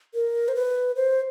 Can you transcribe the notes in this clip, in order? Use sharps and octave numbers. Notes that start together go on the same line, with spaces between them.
A#4
C5
B4
C5